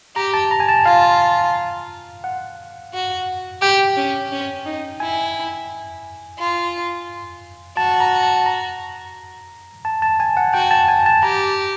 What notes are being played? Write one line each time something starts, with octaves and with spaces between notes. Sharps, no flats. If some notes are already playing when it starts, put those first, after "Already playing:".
G4 A#5
A5
A#5
G#5
A5
F4 F5
F#5
F#4
G4 G5
C#4
C#4
D#4
E4 G#5
F4
F#4 A5
A#5
A5
A#5
A5
A5
G#5
F#5
F#4 G5
A5
G#5
A5
G4 A#5